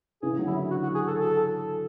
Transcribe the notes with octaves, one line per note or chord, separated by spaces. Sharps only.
C#3 E3 G#4
D3 F#3
E4
F#4
F#4
G#4
A4
A4